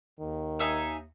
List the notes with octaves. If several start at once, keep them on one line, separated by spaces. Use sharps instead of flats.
D#2 D#3
D#4 E5 G#5